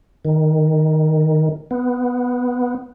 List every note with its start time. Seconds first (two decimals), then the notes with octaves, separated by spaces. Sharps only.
0.25 D#3
1.71 B3